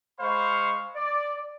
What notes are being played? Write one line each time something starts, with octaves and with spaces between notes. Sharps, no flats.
G#3 C5 F5 B5 C#6
D5